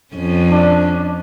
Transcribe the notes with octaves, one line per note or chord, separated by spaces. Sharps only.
F2 C#4
D4